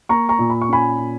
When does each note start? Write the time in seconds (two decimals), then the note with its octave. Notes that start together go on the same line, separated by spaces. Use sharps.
0.09 A#3 A#5 C#6
0.29 A#5 C#6
0.39 A#2
0.50 B5
0.61 C#6
0.69 C#4 G#5 B5
0.98 A#2